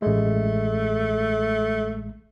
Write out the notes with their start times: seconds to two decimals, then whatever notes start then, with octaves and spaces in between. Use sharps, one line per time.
0.02 A1 G#3 A3